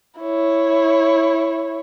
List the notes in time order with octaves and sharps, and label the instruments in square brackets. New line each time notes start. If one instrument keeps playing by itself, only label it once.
[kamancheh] E4 C#5